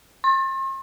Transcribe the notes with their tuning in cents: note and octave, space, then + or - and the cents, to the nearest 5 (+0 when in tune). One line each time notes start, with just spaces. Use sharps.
C6 +45